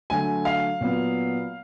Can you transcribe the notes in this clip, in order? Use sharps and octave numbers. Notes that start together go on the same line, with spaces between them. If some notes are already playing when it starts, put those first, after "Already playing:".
D3 F#3 A3 G#5
F5
A#2 F#3 B3